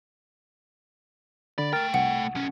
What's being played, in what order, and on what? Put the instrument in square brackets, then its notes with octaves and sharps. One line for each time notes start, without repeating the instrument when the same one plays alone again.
[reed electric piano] D3 B5 [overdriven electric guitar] D5
[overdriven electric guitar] A3 G5 [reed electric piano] A#4 F6 A6
[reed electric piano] C2 [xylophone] F#5
[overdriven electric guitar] B1 C#4